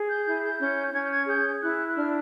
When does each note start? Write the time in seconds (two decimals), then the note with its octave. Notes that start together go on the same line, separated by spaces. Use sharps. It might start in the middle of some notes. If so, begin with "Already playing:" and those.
Already playing: G#4
0.08 G6
0.25 E4 G6
0.42 G6
0.59 C#4 G6
0.93 C#4 G#6
1.02 G6
1.10 G#6
1.27 G#4 G6
1.61 E4 F#6
1.87 F#6
1.95 D4 F6